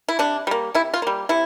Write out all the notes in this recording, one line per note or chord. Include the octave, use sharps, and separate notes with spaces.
E4
C3 D4
G3 A#3
C3 E4
F4
G3 A#3
C3 E4